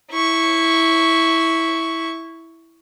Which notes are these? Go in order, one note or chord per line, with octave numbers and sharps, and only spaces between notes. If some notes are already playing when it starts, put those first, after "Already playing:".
E4 C#6